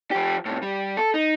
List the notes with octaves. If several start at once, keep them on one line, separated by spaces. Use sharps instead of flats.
F3 G4
A2 C3
G3
A4
D#4